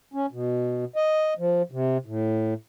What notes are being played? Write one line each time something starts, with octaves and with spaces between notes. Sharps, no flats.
C#4
B2
D#5
F3
C3
A2